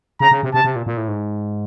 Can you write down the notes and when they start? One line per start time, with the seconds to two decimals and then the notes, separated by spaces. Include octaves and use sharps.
0.20 C#3 A#5
0.31 C#3
0.43 C3
0.54 C3 A5
0.64 C3
0.76 A#2
0.86 A#2
0.97 A2
1.08 G#2